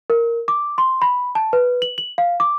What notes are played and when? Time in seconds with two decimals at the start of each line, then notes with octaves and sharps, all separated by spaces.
0.10 A#4
0.48 D6
0.78 C6
1.02 B5
1.35 A5
1.53 B4
1.82 F#7
1.98 F#7
2.18 F5
2.40 D6